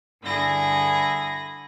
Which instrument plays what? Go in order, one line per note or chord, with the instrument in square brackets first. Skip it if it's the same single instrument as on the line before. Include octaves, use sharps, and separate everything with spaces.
[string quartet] G2 D3 E4 G#4 A#6